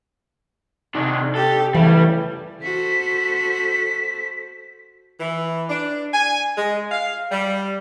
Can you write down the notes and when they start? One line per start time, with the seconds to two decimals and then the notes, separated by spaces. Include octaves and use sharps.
0.95 C3 D#3 D4
1.35 G4 A4
1.75 C#3 E3 G3 A3
2.62 F#4 A4 C5 B6
5.20 E3
5.70 D4
6.14 G#5
6.58 G#3
6.92 F5
7.31 G3